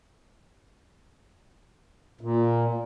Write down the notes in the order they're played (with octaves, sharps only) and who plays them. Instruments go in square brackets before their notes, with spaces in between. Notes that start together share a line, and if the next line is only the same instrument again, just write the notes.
[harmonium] A#2